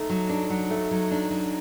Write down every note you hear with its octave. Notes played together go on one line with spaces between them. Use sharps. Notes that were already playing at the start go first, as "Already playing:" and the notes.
Already playing: A3 D#4
F#3
D4
F#3
A3
F#3
D4
F#3